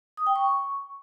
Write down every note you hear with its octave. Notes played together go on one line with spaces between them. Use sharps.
D#6
G5
C#6